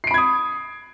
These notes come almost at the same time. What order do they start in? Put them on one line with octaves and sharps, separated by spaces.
C7 D7 B5 G#6 D#6